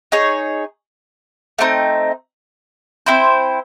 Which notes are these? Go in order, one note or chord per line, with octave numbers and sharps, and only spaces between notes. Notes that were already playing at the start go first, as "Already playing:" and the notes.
D#4 G#4 C#5
A3 C4 D#4
C4 E4 C5